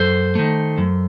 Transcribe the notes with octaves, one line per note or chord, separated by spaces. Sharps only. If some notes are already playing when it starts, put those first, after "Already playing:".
Already playing: F#2 A4 C5
D#3 A3
F#2